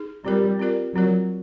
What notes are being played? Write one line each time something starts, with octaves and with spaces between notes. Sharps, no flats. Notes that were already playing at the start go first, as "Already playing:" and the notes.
Already playing: D#4 G#4
G3 C4 F4 A#4 D5
C4 F4 A#4 D5
F#3 C4 F4 A#4 D5